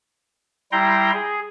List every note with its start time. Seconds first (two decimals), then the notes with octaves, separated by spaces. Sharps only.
0.72 G3 E4 G5 A#5 C6
1.13 G#4